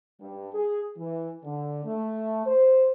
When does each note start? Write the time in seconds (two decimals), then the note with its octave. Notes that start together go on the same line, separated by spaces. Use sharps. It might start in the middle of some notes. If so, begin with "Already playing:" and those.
0.21 G2
0.55 G#4
0.98 E3
1.44 D3
1.85 A3
2.47 C5